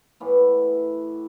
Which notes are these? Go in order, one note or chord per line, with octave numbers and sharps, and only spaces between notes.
A2 E3 B3